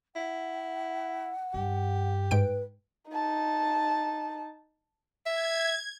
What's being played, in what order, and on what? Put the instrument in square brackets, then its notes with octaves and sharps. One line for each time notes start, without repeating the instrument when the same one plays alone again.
[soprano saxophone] E4 [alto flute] F#5
[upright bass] G2 [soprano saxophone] G4
[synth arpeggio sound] G#2 G5 D7 [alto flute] B4
[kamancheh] D#4 A5
[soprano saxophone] E5 [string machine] G#6